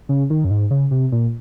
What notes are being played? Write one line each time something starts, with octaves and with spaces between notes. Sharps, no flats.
C#3
D#3
F#2
G#2
C#3
C3
A#2